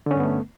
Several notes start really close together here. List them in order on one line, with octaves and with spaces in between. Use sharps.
D3 C#4 G2 B3 A3